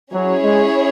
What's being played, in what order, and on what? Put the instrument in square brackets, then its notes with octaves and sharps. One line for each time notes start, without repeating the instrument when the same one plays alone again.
[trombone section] F#3 [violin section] C#4 E4 G#4 C#5
[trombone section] G#3